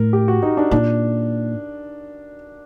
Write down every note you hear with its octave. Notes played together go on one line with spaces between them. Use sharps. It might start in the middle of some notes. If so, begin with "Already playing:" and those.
Already playing: A2 A#4
G4
F#4
D#4
D4
A#2 D4